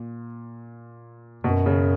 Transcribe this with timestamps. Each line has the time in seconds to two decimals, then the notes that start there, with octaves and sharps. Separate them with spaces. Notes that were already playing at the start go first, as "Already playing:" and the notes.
Already playing: A#2
1.44 F#2 B2
1.66 C#3